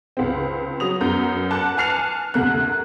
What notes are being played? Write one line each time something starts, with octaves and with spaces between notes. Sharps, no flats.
C#2 C4
F#3 D#6 F7
F#2 B3 A#5 G6
F#5 A5 D6 F#6
G#5 A5 F6 C7 C#7 F7
D2 C3 A#3 F#6